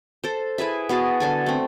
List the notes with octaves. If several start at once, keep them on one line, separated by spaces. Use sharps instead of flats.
A4 C5
E4 G#4 B4 E5
B3 F#4 G#4 A5
D3 A4 G#5
A3 C4